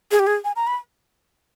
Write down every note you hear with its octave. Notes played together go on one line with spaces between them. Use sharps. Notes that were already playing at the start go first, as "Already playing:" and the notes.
G#4
G4
G#4
G#5
A#5
B5